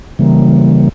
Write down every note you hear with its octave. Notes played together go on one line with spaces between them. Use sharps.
C#3 E3 G3 A#3